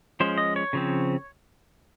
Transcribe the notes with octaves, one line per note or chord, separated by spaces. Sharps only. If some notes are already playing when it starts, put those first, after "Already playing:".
F3 G#3 C#4 C5
D#5
C#5
C#3 F3 C4